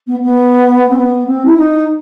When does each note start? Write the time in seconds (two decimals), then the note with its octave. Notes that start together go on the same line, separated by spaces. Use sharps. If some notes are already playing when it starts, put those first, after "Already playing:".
0.06 B3
0.22 B3
0.89 C4
0.96 B3
1.26 C4
1.45 E4
1.56 D#4